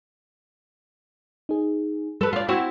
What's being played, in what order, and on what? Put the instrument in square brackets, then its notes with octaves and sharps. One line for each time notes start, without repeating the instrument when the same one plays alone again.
[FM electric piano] D#4 G#4
[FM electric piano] G3 [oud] A4 B4
[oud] F4 D5 [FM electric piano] F6
[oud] C4 E4 F#4